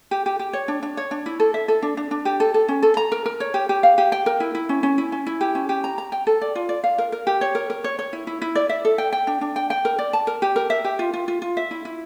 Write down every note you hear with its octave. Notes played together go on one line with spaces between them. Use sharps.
G4
G4
G4
C#5
D4
D4
C#5
D4
E4
A4
E5
A4
D4
D4
D4
G4
A4
A4
C#4
A4
A#5
A#4
A#4
C#5
G4
G4
F5
G4
G5
A#4
E4
E4
C#4
C#4
E4
C#4
E4
G4
C#4
G4
A#5
A#5
G5
A4
D5
F4
D5
F5
A#4
A#4
G4
C#5
A#4
A#4
C#5
C#5
E4
E4
E4
D5
E5
A4
G5
G5
D4
D4
G5
G5
A#4
D5
A5
A#4
G4
A#4
E5
G4
F4
F4
F4
F4
E5
E4
E4